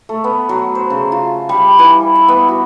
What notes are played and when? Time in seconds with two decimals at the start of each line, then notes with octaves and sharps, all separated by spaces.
0.09 A3
0.24 B3
0.49 F#3
0.75 C5
0.90 C#3
1.12 F4
1.49 G3
1.79 E3
2.15 E5
2.28 B3
2.49 F#4